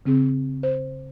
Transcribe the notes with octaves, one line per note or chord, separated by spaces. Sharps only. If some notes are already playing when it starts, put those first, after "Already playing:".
C#3 C4 G#4
C5